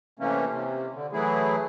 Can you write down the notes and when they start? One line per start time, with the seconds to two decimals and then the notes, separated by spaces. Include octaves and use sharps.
0.19 C3 E3 A3 A#3 C#4
0.50 C3
0.94 D3
1.13 E3 F#3 A3 E4 G#4